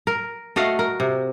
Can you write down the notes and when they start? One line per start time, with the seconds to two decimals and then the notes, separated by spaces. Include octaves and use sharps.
0.07 A#4
0.56 A3 F#4 D#5 F5
0.79 A#4
1.00 C3